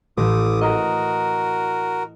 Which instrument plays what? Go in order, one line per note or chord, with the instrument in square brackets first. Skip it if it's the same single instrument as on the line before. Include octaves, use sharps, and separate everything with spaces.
[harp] A1 E3 [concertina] D6 D#6
[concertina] F#4 A#4 [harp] D#5 A#5